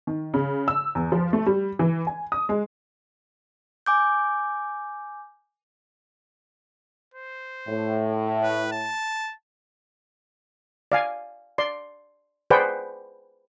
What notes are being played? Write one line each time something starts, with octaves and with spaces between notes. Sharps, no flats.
D#3
C#3
E6
E2
F3
A3
G3
E3
G#5
D#6
G#3
G#5 D6 G6
C5
A2
B4
A5
D5 F5 G#5
D5 C6
G#4 B4 C5 D5 F#5 G5